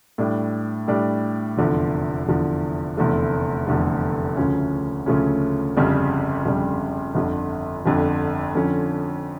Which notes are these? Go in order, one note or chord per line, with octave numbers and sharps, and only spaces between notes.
A2 G3 D4
A2 G3 D4
F1 E2 D3 F3
F1 E2 D3 F3
F1 E2 D3 A3
F1 E2 D3 A3
D2 C#3 F3 A3 C#4
D2 C#3 F3 A3 C#4
G1 F2 C#3 G3
G1 F2 C#3 G3
G1 F2 D3
G1 F2 D3
F2 D3 F3 C#4